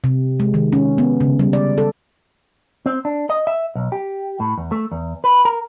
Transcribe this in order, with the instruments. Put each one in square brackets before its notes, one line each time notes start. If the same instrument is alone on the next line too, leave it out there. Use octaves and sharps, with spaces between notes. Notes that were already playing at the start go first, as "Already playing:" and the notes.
[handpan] C3
G#3
D#3
C#4
B3
C#3
G3
D5
A4
[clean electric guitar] C4
D4
D#5
E5
B1
G4
A2
E2
A3
E2
B4
A#4